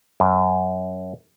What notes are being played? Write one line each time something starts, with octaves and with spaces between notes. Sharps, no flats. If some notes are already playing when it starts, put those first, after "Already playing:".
F#2